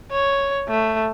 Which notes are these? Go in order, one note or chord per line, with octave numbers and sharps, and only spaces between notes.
C#5
A3